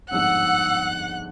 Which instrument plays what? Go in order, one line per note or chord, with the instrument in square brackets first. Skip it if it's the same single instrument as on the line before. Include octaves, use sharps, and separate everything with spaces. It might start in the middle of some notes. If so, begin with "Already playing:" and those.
[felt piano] G1 F2 G#2 [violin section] F#5 [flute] E6 [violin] F#6